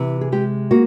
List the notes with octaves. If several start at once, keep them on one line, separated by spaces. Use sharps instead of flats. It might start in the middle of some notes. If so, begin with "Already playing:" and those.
Already playing: C3 E3
G#4
G#3 G4
A#3 F#4